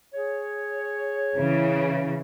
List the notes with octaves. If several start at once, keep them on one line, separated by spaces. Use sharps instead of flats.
G#4 C#5
C#3 E3